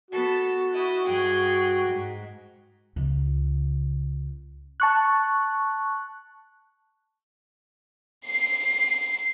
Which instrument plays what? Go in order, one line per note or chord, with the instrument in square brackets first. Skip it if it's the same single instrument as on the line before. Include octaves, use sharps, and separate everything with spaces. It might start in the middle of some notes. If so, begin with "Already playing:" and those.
[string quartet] B3 A4 [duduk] F#4
[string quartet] E4 D#5
G2 G#4 G5
G#2
[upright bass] C#2 C#3
[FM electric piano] A5 C#6 F#6
[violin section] C7